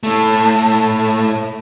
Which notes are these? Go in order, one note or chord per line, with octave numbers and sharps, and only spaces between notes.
A2 A3